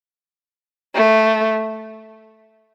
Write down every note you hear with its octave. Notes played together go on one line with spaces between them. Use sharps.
A3